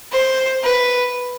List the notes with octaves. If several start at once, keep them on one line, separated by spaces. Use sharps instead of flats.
C5
B4